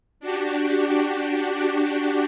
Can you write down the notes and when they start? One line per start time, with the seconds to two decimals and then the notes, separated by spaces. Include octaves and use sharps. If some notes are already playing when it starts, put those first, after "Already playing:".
0.20 D4 F#4 G4